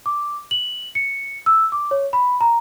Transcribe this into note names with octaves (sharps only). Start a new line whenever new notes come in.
D6
F#7
C#7
E6
D6
C#5
B5
A#5